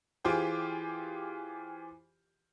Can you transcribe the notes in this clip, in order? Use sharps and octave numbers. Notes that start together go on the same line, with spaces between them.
E3 F4 G4 G#4 C5 G5